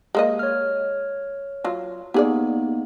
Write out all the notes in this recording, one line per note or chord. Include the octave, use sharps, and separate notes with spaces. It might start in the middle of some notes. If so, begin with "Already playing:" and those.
G#3 A#3 D#5
C#5 F6
F#3 F4
A#3 B3 D#4 G4 G#4 D5